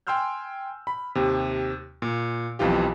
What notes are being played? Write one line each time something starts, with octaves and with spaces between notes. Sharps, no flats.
G5 G#5 C6 E6 F6 G6
B5
D#2 C3
A#2
B1 F2 E3 F4 G4